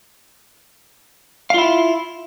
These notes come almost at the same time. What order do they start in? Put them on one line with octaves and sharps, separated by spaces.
F5 F4 E4